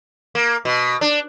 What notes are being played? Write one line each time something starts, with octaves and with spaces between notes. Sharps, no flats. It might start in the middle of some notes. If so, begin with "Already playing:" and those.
A#3
B2
D4